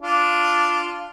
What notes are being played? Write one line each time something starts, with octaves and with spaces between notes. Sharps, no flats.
D4 F4